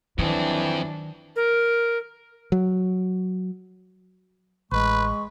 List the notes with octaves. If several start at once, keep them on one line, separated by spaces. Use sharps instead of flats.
F2 D#3 E3 F#3 C4 D4
A#4
F#3
A1 G#3 B4 C#6